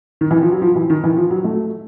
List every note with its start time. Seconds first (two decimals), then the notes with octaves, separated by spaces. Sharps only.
0.21 D#3
0.31 E3
0.42 F3
0.52 F#3
0.62 F3
0.75 E3
0.90 D#3
1.04 E3
1.17 F3
1.31 F#3
1.44 A3